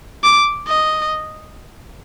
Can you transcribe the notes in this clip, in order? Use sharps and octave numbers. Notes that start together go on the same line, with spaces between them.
D6
D#5